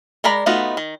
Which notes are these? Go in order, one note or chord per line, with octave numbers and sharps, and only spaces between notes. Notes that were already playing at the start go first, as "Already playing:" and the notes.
G#3 A#4 D5 A#5 B5
A3 B3 D#4 F4 F#4
D#3